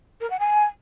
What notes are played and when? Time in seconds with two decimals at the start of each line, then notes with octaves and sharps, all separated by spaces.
0.20 A#4
0.30 F#5
0.39 G#5